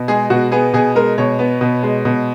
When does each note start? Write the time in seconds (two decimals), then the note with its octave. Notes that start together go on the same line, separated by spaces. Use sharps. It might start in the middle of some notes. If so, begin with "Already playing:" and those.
Already playing: B2
0.08 G#3 G#4
0.30 B2 F#4
0.52 B3 G#4
0.73 B2 G#4
0.95 G#3 A#4
1.18 B2 C#5
1.39 B3
1.61 B2
1.83 G#3
2.05 B2